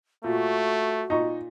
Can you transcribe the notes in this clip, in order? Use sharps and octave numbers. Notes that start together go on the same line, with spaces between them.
A#2 A3 F#4
A#2 D#4 A#5 C#6